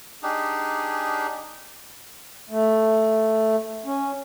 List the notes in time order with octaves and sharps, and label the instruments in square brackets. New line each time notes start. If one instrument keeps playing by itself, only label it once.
[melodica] D4 D#4 G4 G#4
[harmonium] A3
C#4